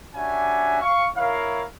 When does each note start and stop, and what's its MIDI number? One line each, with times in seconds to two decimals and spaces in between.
0.14 0.77 55
0.14 0.77 61
0.14 0.77 62
0.14 0.77 66
0.14 0.77 76
0.14 0.77 80
0.81 1.06 77
0.81 1.06 85
1.16 1.63 64
1.16 1.63 70
1.16 1.63 73
1.16 1.63 77